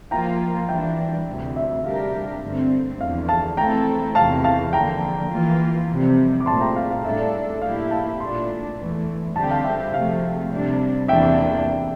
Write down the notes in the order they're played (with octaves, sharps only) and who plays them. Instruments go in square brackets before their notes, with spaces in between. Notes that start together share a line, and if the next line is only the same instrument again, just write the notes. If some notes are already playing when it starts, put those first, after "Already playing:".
[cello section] F3 A#3 F4 [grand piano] G5 A#5
[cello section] E3 G3 D4 [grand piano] E5 G5
[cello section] D2 C3 E3
[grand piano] E5
[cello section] C3 G3 D4 G4 A#4 [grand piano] F5
[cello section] G2 D3 A3 C4
[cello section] E2 D3 F3 [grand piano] F5
[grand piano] F5 A5
[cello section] E3 A3 C4 E4 A4 [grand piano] G5 A#5
[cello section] E2 C3 E3 [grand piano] F5 A5
[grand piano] F5 A5
[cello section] D3 F3 A#3 [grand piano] G5 A#5
[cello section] E3 A#3 F4
F2 C3 G3
[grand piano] D6
[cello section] A#2 A3 C4 [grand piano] A5 C6
[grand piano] G5 A#5
F5
F5
[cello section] A2 G3 D4 A4 [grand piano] E5
[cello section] A2 F3 A#3 E4 G4 [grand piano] F5
[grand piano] F5 A5
[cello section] A#2 A3 D4 [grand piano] A5 C6
[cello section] E2 E3 A3
[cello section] D3 G3 C4 G4 [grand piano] A5
[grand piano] G5
F5 A5
E5 G5
[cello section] C3 F3 A3 [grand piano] F5
[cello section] C3 G3 D4
[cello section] E2 C3 E3 A#3 D4 [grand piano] E5 G5